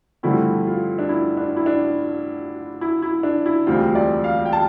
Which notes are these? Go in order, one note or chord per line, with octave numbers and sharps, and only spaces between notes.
G2 D3 F3 A3 C4 E4
F4
D4
E4
D4
E4
D4
E4
E4
D4
E4
E1 D2 C3 G3 C4 F4
D5
F5
G5
A5